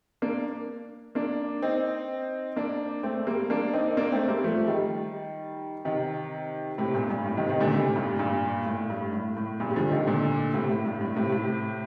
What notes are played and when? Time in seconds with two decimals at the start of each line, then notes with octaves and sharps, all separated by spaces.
0.22 A#3 D4
1.15 A#3 D4
1.62 C4 D#4
2.56 A#3 D4
3.03 A3 C4
3.27 G3 A#3
3.50 A#3 D4
3.73 C4 D#4
3.97 A#3 D4
4.12 A3 C4
4.28 G3 A#3
4.44 F3 A3
4.67 D#3 G3
5.85 C3 D#3
6.78 A2 C3
6.94 G2 A#2
7.10 G2
7.26 A2
7.37 C3 D#3
7.49 C3 D#3
7.60 A#2 D3
7.73 A2 C3
7.96 G2 A#2
8.19 G2 A#2
8.66 A2
8.90 G2
9.13 A2
9.37 A2
9.60 G2 A#2
9.70 G3
9.76 D3 F3
9.91 C3 D#3
10.07 A#2 D3
10.54 A2 C3
10.69 A2
10.86 G2
11.01 A2
11.16 A2 C3
11.32 A2 C3